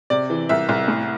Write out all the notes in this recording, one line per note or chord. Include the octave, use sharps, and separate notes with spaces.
C3 D5
E3
C2 E5
C2
A2